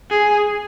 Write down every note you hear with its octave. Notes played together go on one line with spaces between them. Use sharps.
G#4